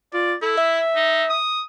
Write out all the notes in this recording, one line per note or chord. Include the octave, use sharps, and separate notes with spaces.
F4 D5
E4 A4
E5
D#4
D#6